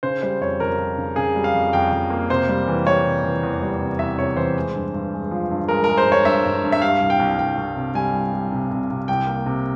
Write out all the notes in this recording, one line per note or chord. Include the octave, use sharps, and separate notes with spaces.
C#3 C5
G3 C5
F2 C#5
F2 A#4
F2
C#3
C#3 G#4
G3
F5
F2
F2 G5
F2
A#3
C3 C5
G3
E3
G3 C#5
C3
E3
E2
G3
C3
E2 E5
C3 C#5
E3 C5
G#3
G2
G2
G#3
F3
G2
G#3 A#4
G#3 A#4
C5
G2
C#5
G2 E5
G2
G2
E5
G3 F5
C2
G5
C2
C2 G5
C2
C3
G3 G#5
C2
G3
C3
C3
C3
C2 G5
A#3
C3